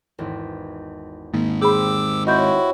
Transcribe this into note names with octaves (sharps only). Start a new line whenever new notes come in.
G#1 E2
G#2 D#3 A#3
G4 G#4 C5 B5 D6 E6
C4 E4 F#4 G4 C#5 D#5 G6